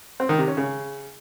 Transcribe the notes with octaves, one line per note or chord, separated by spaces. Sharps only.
C4
D#3
C3
C#4
C#3